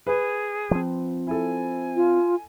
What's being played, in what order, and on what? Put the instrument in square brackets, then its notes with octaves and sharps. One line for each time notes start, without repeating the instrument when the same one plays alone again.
[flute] G#4 [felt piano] B4
[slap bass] F3 C4
[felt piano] E4 A4 [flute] G#5
[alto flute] F4